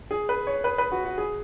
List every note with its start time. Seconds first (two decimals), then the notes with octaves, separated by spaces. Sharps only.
0.11 G#4
0.29 B4
0.47 C#5
0.64 B4
0.78 B4
0.92 F#4
1.05 F#4
1.18 G#4